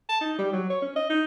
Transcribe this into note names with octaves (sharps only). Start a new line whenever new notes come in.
A5
D#4
G3
F#3
C#5
C#4
D#5
D#4